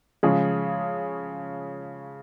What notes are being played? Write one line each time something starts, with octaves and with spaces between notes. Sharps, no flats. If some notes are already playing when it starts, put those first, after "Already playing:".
C#3 F3 G#3 C#4 G#4